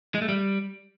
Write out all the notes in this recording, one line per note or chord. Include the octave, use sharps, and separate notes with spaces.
G#3
A3
G3